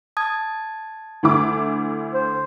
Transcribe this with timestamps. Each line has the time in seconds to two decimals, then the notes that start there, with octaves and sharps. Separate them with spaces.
0.17 A5 D#6 G#6
1.23 D2 E4 D6
2.14 C5